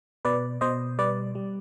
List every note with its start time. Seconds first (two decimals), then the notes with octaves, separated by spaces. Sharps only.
0.25 B2 B4 D5
0.61 B2 C5 D#5
0.99 G3 B4 D5
1.35 G3